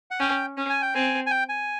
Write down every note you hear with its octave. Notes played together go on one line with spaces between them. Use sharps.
F#5
C#4 G5
C#4
G#5
G5
C4 G#5
G#5
G5
G#5